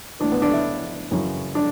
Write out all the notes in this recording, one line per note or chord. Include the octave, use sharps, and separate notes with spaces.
A2 E3 D4
B3
D4
E4
F#2 C#3 E3
D4